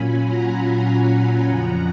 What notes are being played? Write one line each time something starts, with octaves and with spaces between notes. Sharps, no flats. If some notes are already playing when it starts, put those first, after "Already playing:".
Already playing: A#2 F#3 C#4 F4 G#5 B5
F#5 A#5
F#5 A#5
F2 C#3 F3